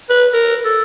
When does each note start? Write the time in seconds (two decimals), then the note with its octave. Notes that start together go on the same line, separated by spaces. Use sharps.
0.09 B4
0.33 A#4
0.65 A4